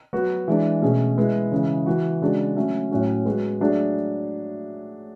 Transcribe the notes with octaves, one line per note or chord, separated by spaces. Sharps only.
F#3 B3 F#4
E3 G#3 D4
B2 A3 C#4 G#4
G#3 B3 E4
C#3 E3 G#3
E3 B3 F#4
C#3 G#3 D4 F#4
F#3 A3 C#4
A2 F#3 C#4 F#4
G#3 B3 F#4
F#3 A3 D4 G#4